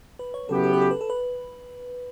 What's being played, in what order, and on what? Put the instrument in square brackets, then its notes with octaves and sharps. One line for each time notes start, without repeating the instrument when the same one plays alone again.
[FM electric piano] B4
C#5
[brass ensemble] C#3 F#3 B3 E4 G4 [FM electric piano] A4
[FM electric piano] A4
B4
A4
B4
A4
B4